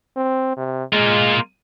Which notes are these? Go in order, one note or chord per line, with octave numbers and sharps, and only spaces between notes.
C4
C3
G#3 A#3 F4